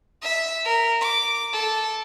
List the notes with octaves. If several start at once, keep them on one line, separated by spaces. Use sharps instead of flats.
E5
A#4
D6
A4